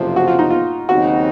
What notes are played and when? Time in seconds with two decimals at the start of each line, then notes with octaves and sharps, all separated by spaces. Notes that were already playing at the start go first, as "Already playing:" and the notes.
Already playing: F#1 F2 C3 F3
0.16 F#4
0.28 F4
0.39 D#4
0.50 F4
0.89 D#2 C#3 F#3 C4 D#4 F#4